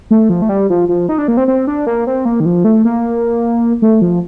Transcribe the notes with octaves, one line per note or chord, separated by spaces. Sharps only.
A3
F3
A3
G3
F3
F3
D#4
D4
A#3
C4
C4
D4
A#3
C4
A#3
D#3
F3
A3
A#3
A3
F3